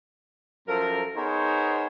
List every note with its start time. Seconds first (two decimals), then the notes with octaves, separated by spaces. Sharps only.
0.68 F#2 F3 A4 A#4
1.16 B3 D#4 G#4 A#4 C5 C#5